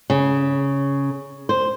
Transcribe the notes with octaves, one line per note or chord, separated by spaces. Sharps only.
C#3
C5